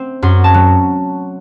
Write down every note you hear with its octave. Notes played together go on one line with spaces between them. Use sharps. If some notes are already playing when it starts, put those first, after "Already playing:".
Already playing: A3 C4
F#2 C6
A5
F#3